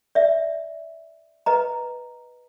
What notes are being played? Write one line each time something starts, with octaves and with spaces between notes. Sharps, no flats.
D5 E5
B4 D#5 A#5